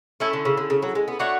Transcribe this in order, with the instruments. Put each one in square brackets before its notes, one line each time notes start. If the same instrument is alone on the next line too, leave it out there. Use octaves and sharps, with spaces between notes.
[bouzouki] A3 [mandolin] C#4 E4 A4
[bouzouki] D3
C#3
D3
C#3
F#3
G#3
B3
[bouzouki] A3 [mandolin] D4 F#4 C#5 F#5